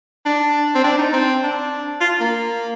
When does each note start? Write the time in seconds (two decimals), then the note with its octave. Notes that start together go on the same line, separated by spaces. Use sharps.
0.26 D4
0.75 C4
0.84 D4
0.99 D#4
1.13 C4
1.43 D4
2.01 F4
2.21 A#3